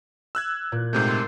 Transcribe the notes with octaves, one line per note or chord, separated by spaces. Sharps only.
E6 F#6 G#6
A#2
G#2 C3 A3 G6 C7
C6 E6 A6